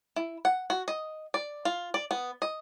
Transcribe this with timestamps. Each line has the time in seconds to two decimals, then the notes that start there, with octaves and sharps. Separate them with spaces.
0.16 E4
0.45 F#5
0.70 F#4
0.88 D#5
1.34 D5
1.65 F4
1.94 D5
2.11 B3
2.42 D#5